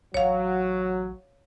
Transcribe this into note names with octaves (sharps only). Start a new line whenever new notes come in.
A1 F#3 C#5 F5